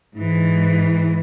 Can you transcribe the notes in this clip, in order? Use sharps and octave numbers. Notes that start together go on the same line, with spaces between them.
G#2 E3